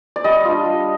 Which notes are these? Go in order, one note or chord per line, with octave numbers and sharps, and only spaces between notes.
D5
G3 D#5
D4 F4
G3